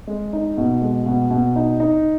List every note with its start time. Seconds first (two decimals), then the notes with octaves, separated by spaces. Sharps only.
0.07 G#3
0.33 D#4
0.57 B2
0.82 G#3
1.06 B2
1.31 B2
1.56 D#4
1.80 D#4